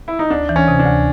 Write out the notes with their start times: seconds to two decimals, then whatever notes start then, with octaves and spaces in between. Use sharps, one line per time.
0.08 E4
0.19 D#4
0.30 D2 D4
0.49 E3
0.56 C#4
0.68 C3
0.79 D4
0.86 D2